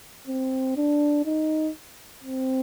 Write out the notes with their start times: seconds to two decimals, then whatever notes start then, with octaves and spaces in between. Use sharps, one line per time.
0.27 C4
0.77 D4
1.26 D#4
2.24 C4